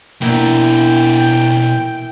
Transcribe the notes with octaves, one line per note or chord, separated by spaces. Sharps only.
B2 E3 A#3 D4 G5